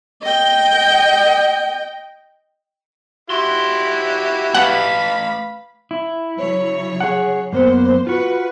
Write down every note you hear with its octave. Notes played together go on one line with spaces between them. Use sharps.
D#5 G5
E4 F#4 G4 C6
A3 B4 F5 F#5 B5
E4
C#3 F#3 C#5
G#4 F#5
F#2 A#3 B3 C5
F4 F#4 B4